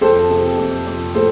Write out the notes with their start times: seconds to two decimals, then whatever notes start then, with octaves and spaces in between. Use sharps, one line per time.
0.01 F2 A4 C5
0.30 C3
0.58 F2
0.87 F2
1.15 A2 A4 C5